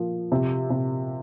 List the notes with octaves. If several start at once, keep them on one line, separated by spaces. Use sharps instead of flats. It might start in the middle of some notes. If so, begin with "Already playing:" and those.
Already playing: F3 A#3
C3
C3